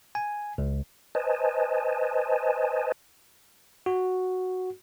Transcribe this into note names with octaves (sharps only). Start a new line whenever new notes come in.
G#5
C#2
B4 C5 D#5 G#5 A5
F#4